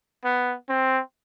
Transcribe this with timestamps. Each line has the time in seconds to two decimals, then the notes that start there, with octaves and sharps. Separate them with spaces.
0.25 B3
0.69 C4